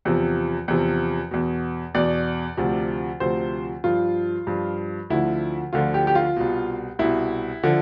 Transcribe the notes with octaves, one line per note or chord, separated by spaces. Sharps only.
E2 C3 F3
E2 C3 F3
E2 B2
E2 B2 D5
D2 C3 F3
D2 C3 F3 C5
G2 F3 F4
G2 F3
D2 D3 F3 E4
D2 D3 F3 F4
G4
G4
F4
C2 B2
C2 B2 E4
D3 F3